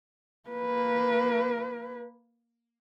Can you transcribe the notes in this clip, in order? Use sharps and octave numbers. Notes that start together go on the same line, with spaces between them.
A#3 B4